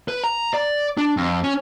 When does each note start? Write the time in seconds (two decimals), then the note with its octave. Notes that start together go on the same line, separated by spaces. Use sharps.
0.08 B4
0.24 A#5
0.54 D5
0.97 D4
1.17 F2
1.44 C#4